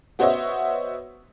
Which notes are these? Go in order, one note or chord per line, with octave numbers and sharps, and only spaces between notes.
B3 F#4 C5 C#5 D#5 E5